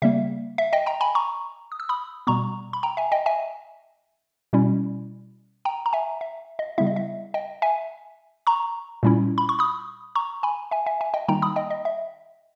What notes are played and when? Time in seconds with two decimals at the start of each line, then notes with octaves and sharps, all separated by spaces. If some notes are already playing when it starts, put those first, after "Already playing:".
0.02 C#3 G3 A#3 E5
0.58 E5
0.73 D#5 G5
0.86 G5 A#5
1.01 G#5 B5
1.15 A#5 C#6
1.72 D#6
1.80 E6
1.89 B5 D#6
2.27 B2 G3 B3 A#5 C#6
2.73 B5
2.83 G5 A#5
2.97 E5 G#5
3.12 D#5 G5
3.26 E5 G#5
4.53 B2 G3 C#4 E4
5.65 G5 A#5
5.86 A#5
5.93 E5 G#5
6.21 E5
6.59 D#5
6.78 C#3 G3 B3 E4 E5
6.87 D#5
6.96 E5
7.34 D#5 G5
7.62 E5 G#5
8.47 A#5 C#6
9.03 A#2 G3 C#4 E4
9.38 B5
9.49 C#6
9.59 B5 D#6
10.15 A#5 C#6
10.43 G#5 B5
10.71 E5 G#5
10.86 E5 G#5
11.01 E5 G#5
11.14 D#5 G5
11.28 D#3 G3 A#3 D#4 G5 A#5
11.42 B5 D#6
11.56 D#5 G5
11.70 D#5
11.85 E5